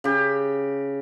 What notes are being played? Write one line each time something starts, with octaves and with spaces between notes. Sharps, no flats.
C#3 G4